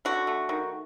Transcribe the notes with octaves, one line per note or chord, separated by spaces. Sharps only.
D3 F#4
A3
D#3